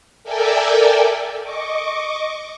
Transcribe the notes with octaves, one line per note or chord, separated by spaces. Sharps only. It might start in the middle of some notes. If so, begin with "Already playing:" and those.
A4 A#4 D5 E5 G5 G#5
D#5 C#6 D6